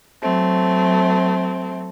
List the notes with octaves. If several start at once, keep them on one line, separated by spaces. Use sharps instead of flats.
F#3 A3 C4